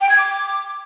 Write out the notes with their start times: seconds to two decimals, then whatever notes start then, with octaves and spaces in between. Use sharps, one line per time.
0.01 G5
0.09 G#6
0.18 D6